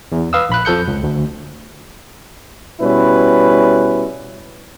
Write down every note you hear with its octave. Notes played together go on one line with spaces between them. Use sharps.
E2
B4 F5 D#6 E6
A#1 B5 F#6
F2 F3 A4 G6 C#7
C#2
D2
B2 G3 C#4 E4 B4